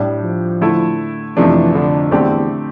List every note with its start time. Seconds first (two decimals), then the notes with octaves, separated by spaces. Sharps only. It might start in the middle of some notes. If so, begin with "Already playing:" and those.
Already playing: A2 G3 D4 G4 D5
0.24 F3
0.61 D3 A3 E4
1.36 F2 C3 E3 F3 A3 D4
1.74 D3
2.11 E2 D3 A3 C4 G4 D5